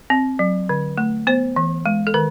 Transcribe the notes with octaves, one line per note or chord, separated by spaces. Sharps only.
C4
F#3
D3
A3
B3 C5
E3
G#3
A4
D#3 A#4